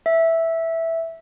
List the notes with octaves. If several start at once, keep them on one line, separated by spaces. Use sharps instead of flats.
E5